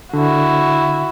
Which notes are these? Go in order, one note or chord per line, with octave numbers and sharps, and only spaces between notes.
D3 E4 F#4